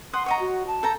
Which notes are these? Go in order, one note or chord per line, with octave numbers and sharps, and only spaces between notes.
F#5 C6 D#6
C#5 D#5 F#5 A#5
F#4
A5
A4 G5 A#5